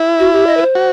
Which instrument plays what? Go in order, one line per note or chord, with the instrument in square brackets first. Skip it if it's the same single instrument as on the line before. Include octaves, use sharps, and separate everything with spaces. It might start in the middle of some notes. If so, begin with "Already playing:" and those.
Already playing: [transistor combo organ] E4
[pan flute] F#4
G4
D#5
B4
C5
[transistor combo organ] F#4